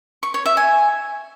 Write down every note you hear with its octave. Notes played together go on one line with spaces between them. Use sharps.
C#6
C#5
E5
G#5